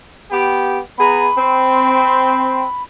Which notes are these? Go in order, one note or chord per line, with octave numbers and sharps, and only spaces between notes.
B3 G4
B3 G#4 A#5 B5
C4